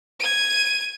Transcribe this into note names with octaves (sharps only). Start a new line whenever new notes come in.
G#6 D#7